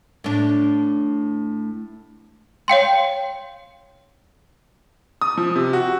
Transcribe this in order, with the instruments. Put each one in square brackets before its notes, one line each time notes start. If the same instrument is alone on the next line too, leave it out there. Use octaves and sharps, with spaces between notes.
[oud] A2 D4
[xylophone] C#5 F5 G5 C6
[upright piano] D#6
F3
C3
F#4